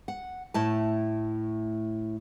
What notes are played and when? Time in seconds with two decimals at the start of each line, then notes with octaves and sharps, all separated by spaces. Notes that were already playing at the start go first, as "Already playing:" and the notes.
0.08 F#5
0.54 A2 A3 E4 A5